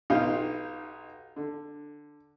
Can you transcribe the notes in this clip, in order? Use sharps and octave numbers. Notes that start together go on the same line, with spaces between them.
B1 D#4 F4 G4 F5
D3